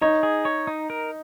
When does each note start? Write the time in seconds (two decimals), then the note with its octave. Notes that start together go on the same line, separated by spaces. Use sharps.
0.01 D#4 C#5
0.23 G#4
0.45 C#5
0.67 D#4
0.90 A#4